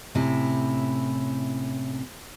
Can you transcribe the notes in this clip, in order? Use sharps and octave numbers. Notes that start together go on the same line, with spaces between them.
A2 C3 C#4 E4